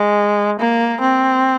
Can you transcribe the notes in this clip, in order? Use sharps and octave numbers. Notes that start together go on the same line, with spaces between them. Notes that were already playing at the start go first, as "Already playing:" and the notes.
Already playing: G#3
A#3
C4